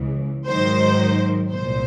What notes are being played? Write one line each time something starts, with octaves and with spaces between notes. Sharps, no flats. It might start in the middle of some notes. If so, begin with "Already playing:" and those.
Already playing: C#2 C#3 E3
G#2 D#3 F#3 C5
C2 A#2 F3 C5